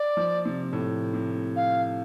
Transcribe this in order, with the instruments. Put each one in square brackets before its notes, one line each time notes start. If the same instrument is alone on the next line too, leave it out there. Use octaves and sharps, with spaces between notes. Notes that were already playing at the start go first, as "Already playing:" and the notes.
Already playing: [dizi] D5
[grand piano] F3
C3
A2
C3
[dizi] F5